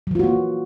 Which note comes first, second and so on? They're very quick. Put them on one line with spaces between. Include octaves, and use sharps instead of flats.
F#3 E3 F4 F#4 A#3